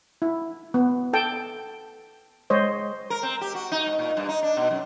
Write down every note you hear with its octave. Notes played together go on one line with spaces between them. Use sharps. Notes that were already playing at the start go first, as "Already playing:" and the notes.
E4
B3
A4 G5 A5
G#3 C5 C#5 D#5
A#4
C4
G4
F#4
D#4
G#2
A#2
G2
D#4
D4
B2
F#2